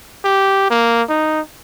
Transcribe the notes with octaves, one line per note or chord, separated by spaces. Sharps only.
G4
A#3
D#4